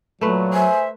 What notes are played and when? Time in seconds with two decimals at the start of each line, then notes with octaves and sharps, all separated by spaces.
0.21 A#2 F#3 A3 B4
0.53 C5 E5 G#5